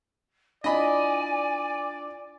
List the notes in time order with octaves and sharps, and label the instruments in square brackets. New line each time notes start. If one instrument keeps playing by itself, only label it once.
[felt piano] D4 E4 F4 [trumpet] D5 [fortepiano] D#5 B5 [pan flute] G#5